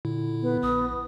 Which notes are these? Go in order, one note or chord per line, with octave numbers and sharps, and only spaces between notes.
A#2 D3 E4
B3
A#1 D#6